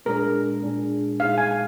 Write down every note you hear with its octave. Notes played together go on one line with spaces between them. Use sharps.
A#2 G#3 D4 G#4 A#4
A#2 G#3 D4 G#4
A#2 G#3 D#4 G#4 F5
G#5